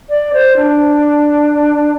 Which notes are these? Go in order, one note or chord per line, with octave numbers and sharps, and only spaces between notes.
D5
C5
D4